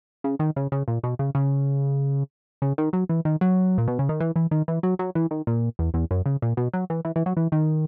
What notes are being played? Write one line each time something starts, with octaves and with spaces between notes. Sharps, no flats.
C#3
D#3
C#3
C#3
A#2
B2
C#3
C#3
C#3
D#3
F#3
E3
D#3
F#3
A#2
B2
C#3
D#3
E3
E3
D#3
E3
F#3
F#3
E3
D#3
A#2
E2
E2
F#2
C#3
A#2
B2
F#3
E3
E3
E3
F#3
E3
D#3